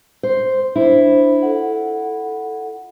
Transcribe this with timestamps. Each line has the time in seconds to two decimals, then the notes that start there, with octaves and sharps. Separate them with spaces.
0.23 C5
0.76 D4 E4 C5
1.43 F4 A4 F#5